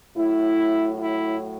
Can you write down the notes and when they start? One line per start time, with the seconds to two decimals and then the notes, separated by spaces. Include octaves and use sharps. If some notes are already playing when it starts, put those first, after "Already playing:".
0.17 A2 F#3 E4
1.00 E4